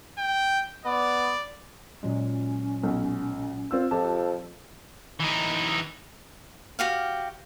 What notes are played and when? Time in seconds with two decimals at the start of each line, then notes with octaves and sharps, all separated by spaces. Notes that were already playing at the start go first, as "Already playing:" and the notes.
0.18 G5
0.85 B3 D5
2.03 A#2 F#3 G#3 C#4
2.83 B1
3.71 C4 F4 E6
3.91 F2 F3 G4 A5
5.20 E3 D#4
6.79 F#4 G4 F5